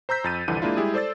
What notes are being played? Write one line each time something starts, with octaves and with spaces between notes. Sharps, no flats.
C5 A#5 E6 G6 B6
F2 A6 D#7
C2 F2 D3 E3 D4 D#7
G#3 A#3 D4 E4 F4
G3 G#3 E4 G4 G#4
A4 C5 D5 E6 A6